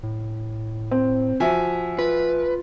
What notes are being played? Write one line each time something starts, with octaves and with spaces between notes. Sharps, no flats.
A2
C4
F3 F#4 E5 G#5
F4 B4